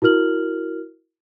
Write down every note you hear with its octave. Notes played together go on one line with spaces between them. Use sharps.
E4 F#4 A#4 F6 F#7